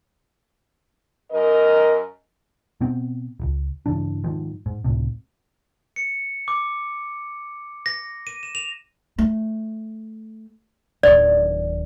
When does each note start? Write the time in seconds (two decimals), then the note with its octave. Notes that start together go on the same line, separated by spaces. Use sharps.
1.32 F#2 A#4 D#5
2.81 B2 B3 C4
3.40 D1 C#2
3.86 G2 C#3 E3 D4
4.24 G#2 D#3 F3
4.66 G#2
4.84 C#2 A2 C3
5.96 C#7
6.48 D6
7.86 A#6
8.27 D#7
8.43 E7
8.55 F7
9.18 A3
11.03 D1 D#3 D5